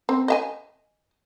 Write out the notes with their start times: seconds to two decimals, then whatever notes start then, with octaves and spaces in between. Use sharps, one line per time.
0.09 C4
0.28 D#5 E5 G#5